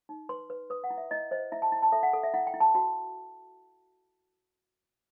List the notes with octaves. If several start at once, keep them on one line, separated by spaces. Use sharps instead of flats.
D#4
B4 C6
B4
B4 D#6
F#5
E4
E5
E4 D#5
C5 D#5
E4 E5
A5
E4
A5
A4 E5
F#5
A4
E5
E4 F#5
G5
E4
A5
F#4 A5